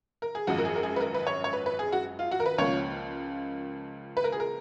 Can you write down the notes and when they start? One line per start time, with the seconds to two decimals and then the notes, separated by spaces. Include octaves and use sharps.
0.22 A#4
0.35 G#4
0.47 G#1 F#2 F3 F#4
0.58 A#4
0.65 G#4
0.76 A#4
0.83 G#4
0.96 B4
1.00 A#4
1.14 B4
1.27 C#5
1.44 C#5
1.53 B4
1.66 B4
1.79 G#4
1.92 F#4
2.19 F4
2.31 F#4
2.40 A#4
2.46 B4
2.58 C#2 C#3 F3 A#3 C#5
4.17 B4
4.24 A#4
4.32 G#4
4.40 A#4